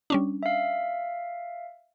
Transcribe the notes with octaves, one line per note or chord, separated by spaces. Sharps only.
G3 C#4 D4
E5 F5